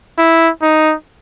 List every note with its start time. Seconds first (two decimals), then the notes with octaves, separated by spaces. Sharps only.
0.18 E4
0.62 D#4